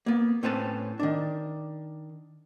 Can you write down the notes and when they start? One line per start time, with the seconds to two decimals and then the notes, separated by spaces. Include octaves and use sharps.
0.06 A#3 B3
0.43 A2 C4 C#4 B4 C5 A5
1.00 D#3 D4